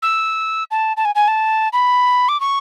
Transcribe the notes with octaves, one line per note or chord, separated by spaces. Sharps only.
E6
A5
A5
G#5
G#5
A5
B5
D6
C#6